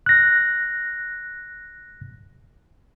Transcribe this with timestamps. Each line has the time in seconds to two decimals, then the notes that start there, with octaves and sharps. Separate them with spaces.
0.06 F#6 A#6